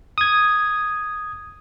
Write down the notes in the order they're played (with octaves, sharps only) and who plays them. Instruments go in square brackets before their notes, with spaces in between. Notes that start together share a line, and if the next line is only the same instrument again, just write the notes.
[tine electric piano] D#6 G#6